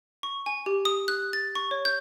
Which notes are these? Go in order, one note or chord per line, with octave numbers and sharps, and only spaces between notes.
C#6
G#5
G4
D#6
F#6
A6
C#6
C#5
G6